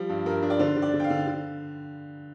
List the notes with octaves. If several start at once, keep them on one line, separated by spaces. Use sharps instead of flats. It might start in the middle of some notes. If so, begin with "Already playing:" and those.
Already playing: F3 G3
G2
G2 A#4
D4
D5
D3 C5
D3
D5
D3
G5
F5
D3
D3